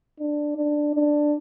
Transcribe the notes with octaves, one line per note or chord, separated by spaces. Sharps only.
D4
D4
D4